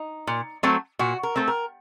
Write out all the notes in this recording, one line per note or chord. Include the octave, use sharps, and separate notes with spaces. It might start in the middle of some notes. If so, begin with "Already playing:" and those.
Already playing: D#4
A#2
F#3 A3 C4
A#2 F#4
A#4
A3 C4
A#4